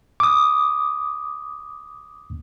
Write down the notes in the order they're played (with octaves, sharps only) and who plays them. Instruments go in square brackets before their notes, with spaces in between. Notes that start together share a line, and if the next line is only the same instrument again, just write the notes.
[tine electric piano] D6 D#6